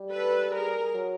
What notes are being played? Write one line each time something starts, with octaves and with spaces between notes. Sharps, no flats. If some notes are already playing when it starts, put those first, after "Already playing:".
Already playing: G3
A4 B4
G#4 A#4
F#3